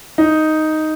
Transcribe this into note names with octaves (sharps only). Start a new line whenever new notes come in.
D#4